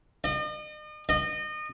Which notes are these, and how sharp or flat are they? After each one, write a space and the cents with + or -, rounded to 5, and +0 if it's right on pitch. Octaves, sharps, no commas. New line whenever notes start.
D#5 -40
D#5 -30